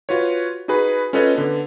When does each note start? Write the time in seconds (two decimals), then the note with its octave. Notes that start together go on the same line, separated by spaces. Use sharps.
0.09 F4 F#4 B4 C#5
0.68 D#4 F#4 G#4 B4 B5
1.13 C#4 F4 A4 B4 C#5 D#5
1.35 D3 B3